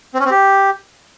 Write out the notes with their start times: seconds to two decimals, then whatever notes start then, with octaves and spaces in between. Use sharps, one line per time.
0.14 C4
0.20 C#4
0.25 C4
0.30 G4